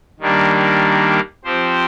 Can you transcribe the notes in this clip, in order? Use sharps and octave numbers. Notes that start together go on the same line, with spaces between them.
D#3 G3 A#3 D4
F3 C4 G4 C5